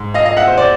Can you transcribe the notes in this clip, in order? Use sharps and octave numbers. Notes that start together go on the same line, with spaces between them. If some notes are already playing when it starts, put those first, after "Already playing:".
Already playing: G#2
D#5 F5
D#5 F5
E5 F#5
C5
C5 D5